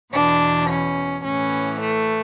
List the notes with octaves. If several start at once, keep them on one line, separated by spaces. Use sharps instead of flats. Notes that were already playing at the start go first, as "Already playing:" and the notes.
E2 B2 D4
C#4
A2 E3 C#4
A3